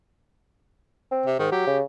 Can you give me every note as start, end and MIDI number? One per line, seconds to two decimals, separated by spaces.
1.11 1.28 60
1.26 1.39 48
1.39 1.50 44
1.39 1.49 51
1.52 1.67 54
1.52 1.78 67
1.67 1.82 49